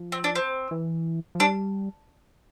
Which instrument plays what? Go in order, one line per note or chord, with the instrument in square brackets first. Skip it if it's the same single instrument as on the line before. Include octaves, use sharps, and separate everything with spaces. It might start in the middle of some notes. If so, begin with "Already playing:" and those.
Already playing: [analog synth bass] F3
[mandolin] C4
D4
C4
[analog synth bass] E3
F3
[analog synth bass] G3 [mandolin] D4